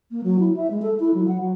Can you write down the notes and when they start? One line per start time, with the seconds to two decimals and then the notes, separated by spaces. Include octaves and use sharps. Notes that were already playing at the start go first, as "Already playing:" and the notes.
0.11 A#3
0.24 F#3
0.40 E4
0.56 E5
0.71 G#3
0.82 A4
1.00 E4
1.14 F#3
1.28 F#5
1.41 F#3